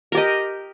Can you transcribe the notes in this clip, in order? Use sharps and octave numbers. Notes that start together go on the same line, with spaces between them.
G4 A#4 D#5